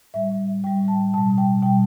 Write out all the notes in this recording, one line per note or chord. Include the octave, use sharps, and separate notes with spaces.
A2 G3 E5
A2 G3 G5
A5
B2 G3 A5
G5
B2 G3 G5